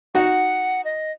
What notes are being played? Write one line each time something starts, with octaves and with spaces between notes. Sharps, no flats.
D#4 F#4 F#5
D#5